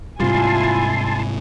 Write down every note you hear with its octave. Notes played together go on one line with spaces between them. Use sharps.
G#2 C3 G3 E4 F4 G#5 A5 C6